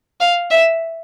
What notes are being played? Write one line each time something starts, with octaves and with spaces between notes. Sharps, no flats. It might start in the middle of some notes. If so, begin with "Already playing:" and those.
F5
E5